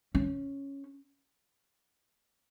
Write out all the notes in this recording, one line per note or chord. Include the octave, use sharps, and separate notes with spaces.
C#4